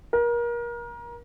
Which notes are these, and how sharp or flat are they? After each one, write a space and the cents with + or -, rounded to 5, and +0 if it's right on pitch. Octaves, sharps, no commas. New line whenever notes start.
A#4 +30